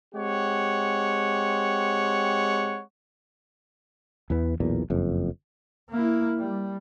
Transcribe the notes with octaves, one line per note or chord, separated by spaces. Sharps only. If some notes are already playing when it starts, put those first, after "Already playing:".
G#3 C4 G4 C#5 F#5
E2 E3 B3
B1 E2 A#2
F#1 F2
A#3 E4
G3